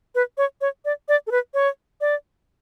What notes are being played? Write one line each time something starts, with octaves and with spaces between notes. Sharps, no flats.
B4
C#5
C#5
D5
D5
A4
B4
C#5
D5